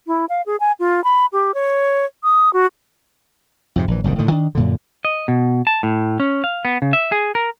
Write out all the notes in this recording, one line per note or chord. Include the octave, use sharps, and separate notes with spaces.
E4
F5
G#4
G#5
F4
B5
G4
C#5
D#6
F#4
F2 G#2 C3
A#1 E3
F#1 C2 G#2 D#3
A2 D3 D#3
D#3 D4
F#2 A#2 D3
D#5
B2
A5
A2
C#4
F5
B3
C#3
E5
G#4
A#4